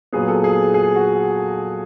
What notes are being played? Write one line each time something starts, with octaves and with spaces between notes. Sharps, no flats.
A#2 F#3 B3 G#4
A4
G#4
G#4
F#4